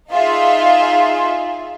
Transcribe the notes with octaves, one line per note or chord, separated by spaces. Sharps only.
D#4 F4 G#4 E5